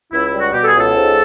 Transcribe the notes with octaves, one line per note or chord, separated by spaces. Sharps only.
C#2 E4
E4
G3
F#4
B2 G4
A4
G#4
C#2
A4
G#2